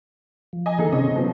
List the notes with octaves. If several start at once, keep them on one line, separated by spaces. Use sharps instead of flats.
F3
D#5 G#5
D#3 E3 A#3 D#4 G#4 A4
C3 C4 C#4 G#4 D#5
F3 F#3 B3 C#4